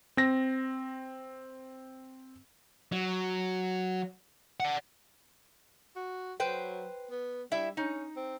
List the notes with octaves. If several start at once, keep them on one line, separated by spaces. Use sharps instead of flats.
C4 A#6
F#3
D5 F#5
F#4
F#3 B4 C5 G5
B3
G3 E4 E5
C#4 D#4
C4